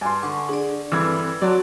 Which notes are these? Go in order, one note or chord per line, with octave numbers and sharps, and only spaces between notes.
G2 G#5 C6
D3 C#6
D4 G#4 D5
G2 E3 C4 A4 E6 G#6
F#3 D5 A5 C6